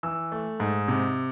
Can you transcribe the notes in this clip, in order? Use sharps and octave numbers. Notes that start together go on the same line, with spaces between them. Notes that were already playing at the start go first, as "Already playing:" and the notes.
E3 E6
A3
G#2
C3